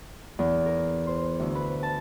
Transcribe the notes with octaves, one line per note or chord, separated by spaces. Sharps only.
E2
A#4
C5
D2
B4
A5